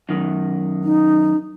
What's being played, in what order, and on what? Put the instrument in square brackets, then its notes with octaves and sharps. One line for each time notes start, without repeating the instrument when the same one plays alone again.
[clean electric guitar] F#2 D#3
[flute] D#4